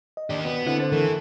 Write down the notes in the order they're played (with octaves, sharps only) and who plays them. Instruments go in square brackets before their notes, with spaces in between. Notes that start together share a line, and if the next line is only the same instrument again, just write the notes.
[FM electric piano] D#5
[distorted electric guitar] D#3 G4 [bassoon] D4
[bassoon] B2 [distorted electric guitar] B3
[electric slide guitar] D3 [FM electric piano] C4 E4 F#5
[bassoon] C5 [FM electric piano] A6
[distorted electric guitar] E3 [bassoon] A3 [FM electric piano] A#4